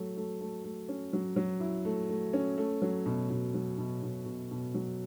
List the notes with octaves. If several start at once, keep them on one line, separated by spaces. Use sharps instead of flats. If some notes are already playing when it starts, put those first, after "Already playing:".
Already playing: F#3 A3
A3
A3
A3
C#4
F#3
F#3
E4
A3
A3
C#4
A3
F#3
B2
B2
F#3
B2
B2
B2
B2
F#3